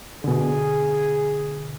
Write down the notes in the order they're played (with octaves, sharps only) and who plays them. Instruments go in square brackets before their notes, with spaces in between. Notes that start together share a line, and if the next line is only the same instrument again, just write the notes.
[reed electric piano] B2 D3 [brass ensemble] G#4